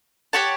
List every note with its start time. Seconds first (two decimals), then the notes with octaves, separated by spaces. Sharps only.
0.33 G4 C#5 F#5 A5